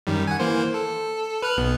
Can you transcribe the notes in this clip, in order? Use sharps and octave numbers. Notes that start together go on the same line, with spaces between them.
F#2 D#3 G3
F#5 G#5
E3 A#3 C5
A4
B4 F6 F#6
B1 B3